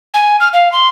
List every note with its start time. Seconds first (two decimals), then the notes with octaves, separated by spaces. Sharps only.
0.14 G#5
0.40 F6
0.53 F5
0.72 C6